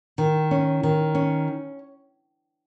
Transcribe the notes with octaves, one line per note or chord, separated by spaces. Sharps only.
D#3
C#4
D#3
C#4